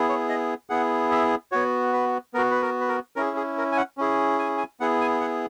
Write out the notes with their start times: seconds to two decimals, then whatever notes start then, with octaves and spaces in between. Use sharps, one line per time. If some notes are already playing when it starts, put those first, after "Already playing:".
Already playing: B3 E4 G#4
0.09 C#5
0.29 D#5
0.70 B3 E4 G#4 F#5
1.12 E5
1.52 B3 F#4 C#5
1.93 B4
2.34 B3 A#4
2.38 F#4
2.51 B4
2.62 A#4
2.81 B4
2.88 A#4
3.16 C#4 E4 G#4 A#4
3.37 G#4
3.58 A#4
3.72 G#5
3.77 F#5
3.98 C#4 E4 G#4
4.39 G#5
4.58 G#5
4.80 B3 E4 G#4 F#5
5.01 G#5
5.20 F#5